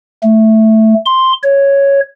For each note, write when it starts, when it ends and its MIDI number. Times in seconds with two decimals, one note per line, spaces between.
0.23 0.94 57
1.06 1.33 84
1.43 2.01 73